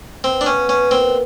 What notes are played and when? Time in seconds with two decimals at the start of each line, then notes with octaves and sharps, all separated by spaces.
0.24 B3 C4
0.41 D4
0.46 B3 C#4
0.68 B3 C#4
0.91 A#2 C4